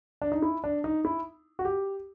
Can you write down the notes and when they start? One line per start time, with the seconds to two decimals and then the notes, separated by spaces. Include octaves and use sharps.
0.22 D4
0.32 D#4
0.42 E4
0.64 D4
0.84 D#4
1.05 E4
1.59 F#4
1.65 G4